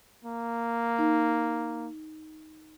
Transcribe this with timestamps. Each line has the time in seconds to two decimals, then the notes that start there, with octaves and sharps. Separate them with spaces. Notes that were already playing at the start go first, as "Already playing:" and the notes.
0.25 A#3
0.99 D#4